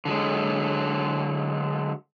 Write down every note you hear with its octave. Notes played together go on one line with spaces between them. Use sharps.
D3 F#3 G#3